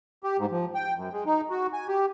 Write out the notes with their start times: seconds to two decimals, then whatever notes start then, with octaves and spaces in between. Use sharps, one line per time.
0.23 G4
0.38 G#2
0.51 F3
0.75 G5
0.96 F#2
1.13 G#3
1.26 D#4
1.50 F#4
1.73 G#5
1.88 G4